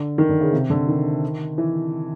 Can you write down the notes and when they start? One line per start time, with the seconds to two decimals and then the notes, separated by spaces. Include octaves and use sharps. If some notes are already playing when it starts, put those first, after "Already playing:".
Already playing: D3
0.18 D#3
0.29 D3
0.41 C#3
0.53 C3
0.70 D3
0.88 D#3
1.58 E3